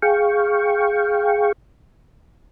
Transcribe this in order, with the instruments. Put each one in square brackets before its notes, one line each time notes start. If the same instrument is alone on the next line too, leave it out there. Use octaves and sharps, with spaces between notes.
[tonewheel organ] G#4 F5 G5 C#6